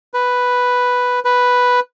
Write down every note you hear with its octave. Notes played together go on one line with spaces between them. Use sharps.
B4
B4